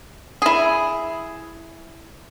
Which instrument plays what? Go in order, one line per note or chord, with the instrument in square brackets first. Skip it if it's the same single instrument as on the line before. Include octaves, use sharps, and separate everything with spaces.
[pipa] E4 G#4